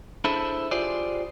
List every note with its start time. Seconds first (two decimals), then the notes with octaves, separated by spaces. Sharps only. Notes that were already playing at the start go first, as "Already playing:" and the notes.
0.24 D4 E4 G#4 A4 C5 E5
0.71 F4 G4 G#4 C5 D5